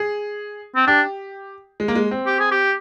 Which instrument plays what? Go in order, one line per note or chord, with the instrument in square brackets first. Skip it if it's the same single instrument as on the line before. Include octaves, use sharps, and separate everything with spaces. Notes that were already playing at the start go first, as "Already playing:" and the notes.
Already playing: [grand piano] G#4
[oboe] C4
[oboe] D4 [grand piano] G4
[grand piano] G#3
A#3
G#3
C4
[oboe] G4
G#4
G4